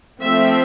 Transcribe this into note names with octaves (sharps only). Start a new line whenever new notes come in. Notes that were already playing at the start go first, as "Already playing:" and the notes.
F3 A3 C4 E5